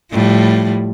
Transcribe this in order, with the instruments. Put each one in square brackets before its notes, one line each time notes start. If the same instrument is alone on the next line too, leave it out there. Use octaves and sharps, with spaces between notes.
[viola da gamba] A2 F3 G3